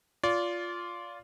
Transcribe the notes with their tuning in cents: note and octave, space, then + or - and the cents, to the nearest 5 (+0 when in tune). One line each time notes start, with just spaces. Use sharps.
F4 +0 D5 -25